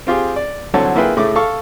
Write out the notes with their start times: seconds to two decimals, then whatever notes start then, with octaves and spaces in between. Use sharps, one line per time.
0.07 C4 F4 G4 G#4
0.36 D5
0.74 C2 D3 F#3 C4 C#5 A5
0.96 A#3 E4 F4 G#4 B4 G5
1.17 A2 C#3 A3 D6
1.36 A4 F5 C#6